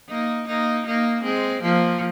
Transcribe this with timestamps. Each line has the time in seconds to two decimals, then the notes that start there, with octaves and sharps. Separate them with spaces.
0.09 A#3 D#4
0.47 A#3 D#4
0.86 A#3 D#4
1.23 G#3 C4
1.62 F3 A#3